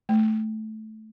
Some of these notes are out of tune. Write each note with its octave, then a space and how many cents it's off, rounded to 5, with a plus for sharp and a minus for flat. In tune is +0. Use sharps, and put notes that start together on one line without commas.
A3 -10